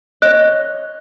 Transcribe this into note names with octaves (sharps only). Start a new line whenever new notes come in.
C#5 D#5 F#6